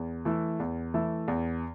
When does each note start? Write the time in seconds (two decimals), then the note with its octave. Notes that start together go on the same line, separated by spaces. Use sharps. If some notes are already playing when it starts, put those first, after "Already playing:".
Already playing: E2
0.25 E3 A3 E4
0.60 E2
0.94 E3 A3 E4
1.28 E2